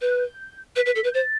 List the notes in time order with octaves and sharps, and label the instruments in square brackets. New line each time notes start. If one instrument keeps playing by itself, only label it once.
[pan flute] B4 [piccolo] G6
[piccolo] F#6
G6
[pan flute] B4 [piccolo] B6
[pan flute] B4
A4
B4
[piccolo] G6
[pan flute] C5 [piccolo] A6